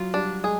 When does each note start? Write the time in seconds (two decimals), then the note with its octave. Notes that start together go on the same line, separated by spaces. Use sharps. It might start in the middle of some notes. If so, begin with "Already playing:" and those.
Already playing: F#3 F4
0.14 G3 D4
0.44 G#3 G#4